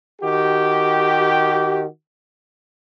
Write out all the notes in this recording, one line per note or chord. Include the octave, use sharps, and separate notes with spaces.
D#3 F#4 G4